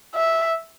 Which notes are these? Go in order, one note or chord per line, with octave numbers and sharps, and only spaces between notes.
E5